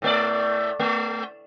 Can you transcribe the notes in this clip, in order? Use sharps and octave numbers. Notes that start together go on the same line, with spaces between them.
A2 A3 D5
A3